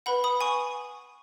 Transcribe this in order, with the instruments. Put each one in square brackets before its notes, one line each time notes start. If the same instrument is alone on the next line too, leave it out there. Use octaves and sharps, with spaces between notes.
[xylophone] B4 F#5 B5
B5 D#6
G#5 C#6